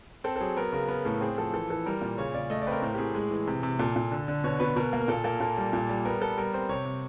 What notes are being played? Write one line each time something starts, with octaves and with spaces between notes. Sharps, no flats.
C4 A4
A4
F#3 G#4
B3 A#4
C#3 A#4
B3 A#4
A2 A4
C4 G#4
F3 A4
E3 A4
E3 A4
G3 A#4
A#2
C#3 C#5
C#3 D5
A3 D#5
D5
C4 A#4 B4
A2 A#4
G4
A2 G#4
G#3
E3
C3
C3
A#2 A4
A#2
D3
D3
B2 C#5
B2 B4
B2 A#4
A#3
A#4
A#2 A4
A#3 A4
A#2 A4
G3
A#2
G3
B3 A#4
B3 A4
G3 A#4
C4 C5
C3 C#5
C3